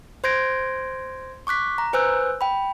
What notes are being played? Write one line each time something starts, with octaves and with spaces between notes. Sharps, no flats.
C5 C6 G6 G#6 A#6 D7
C#6 D6 F#6 B6
A#5
B4 C5 G#5 E6 F#6 G6
G5 B5